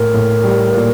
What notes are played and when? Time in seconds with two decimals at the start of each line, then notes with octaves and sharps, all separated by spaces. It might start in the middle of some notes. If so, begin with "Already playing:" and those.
Already playing: A2 A#4
0.14 A2
0.44 G3
0.74 A#2